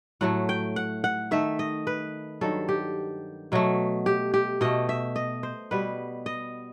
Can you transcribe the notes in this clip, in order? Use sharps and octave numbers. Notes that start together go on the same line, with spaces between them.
A2 F#3 A3 F#5
G5
F#5
F#5
D#3 A3 E5
D#5
B4
G2 D#3 F#3 A4
G4
B2 F#3 A3
G4
G4
B2 A3 D#5
E5
D#5
C5
B2 G3 B3 B4
D#5